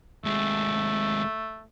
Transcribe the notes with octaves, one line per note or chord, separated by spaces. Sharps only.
D#2 G#3 A3